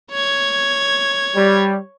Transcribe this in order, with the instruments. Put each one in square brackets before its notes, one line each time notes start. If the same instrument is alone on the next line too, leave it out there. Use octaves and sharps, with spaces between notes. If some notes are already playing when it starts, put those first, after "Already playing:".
[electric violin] C#5 G#6
[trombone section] G3